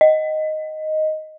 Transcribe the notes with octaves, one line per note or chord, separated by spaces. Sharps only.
D#5